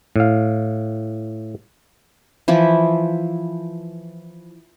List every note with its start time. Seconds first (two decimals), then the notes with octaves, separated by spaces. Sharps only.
0.16 A2 F5
2.48 E3 F3 E4